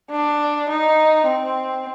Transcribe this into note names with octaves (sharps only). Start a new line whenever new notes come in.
D4
D#4
C4